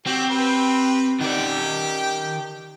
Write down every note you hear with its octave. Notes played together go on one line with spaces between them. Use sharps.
C4 F#4 G4
G4 B4
D#3 G4 D5 G5